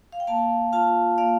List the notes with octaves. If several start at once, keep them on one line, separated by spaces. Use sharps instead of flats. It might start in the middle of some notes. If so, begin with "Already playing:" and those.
F5
G5
A#3 F5 A5
F4 F5 A5
A#3 D5 F5